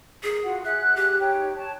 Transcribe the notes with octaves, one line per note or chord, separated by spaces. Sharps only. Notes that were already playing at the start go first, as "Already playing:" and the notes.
G#4 A#4
F4 F#4 F#5
G#4 E5 F#5 F#6
G4
D#4 C#5 G5
C#5 A5